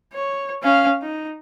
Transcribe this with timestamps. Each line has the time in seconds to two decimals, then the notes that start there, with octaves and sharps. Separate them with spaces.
0.13 C#5
0.63 C#4 F5
1.02 D#4